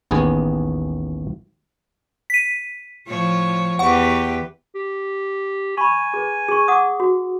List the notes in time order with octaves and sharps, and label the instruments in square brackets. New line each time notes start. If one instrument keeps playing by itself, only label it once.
[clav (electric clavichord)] A1 D#2 B3 G#4
[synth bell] B6 D#7
[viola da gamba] A2 F3 C#5
[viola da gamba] E2 G4 B4 [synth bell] F#5 C#6
[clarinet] G4
[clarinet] G#5 [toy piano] B5 C#6
[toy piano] G#4 B4
G#4 C#6
F#5 D6 D#6
F#4